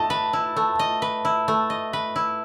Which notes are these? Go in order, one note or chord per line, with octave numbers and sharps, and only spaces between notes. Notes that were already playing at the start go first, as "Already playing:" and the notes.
Already playing: A3 D#5 A5
B4
E4
A3
D#5
B4
E4
A3
D#5
B4
E4